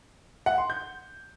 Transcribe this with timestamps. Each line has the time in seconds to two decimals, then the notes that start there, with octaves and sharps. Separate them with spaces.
0.46 F#5
0.58 C6
0.70 G6